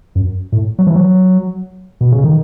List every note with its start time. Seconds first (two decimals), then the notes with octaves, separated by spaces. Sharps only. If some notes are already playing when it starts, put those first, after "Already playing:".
0.15 F#2
0.52 A2
0.79 F#3
0.87 E3
0.96 F#3
2.01 B2
2.12 C#3
2.24 D#3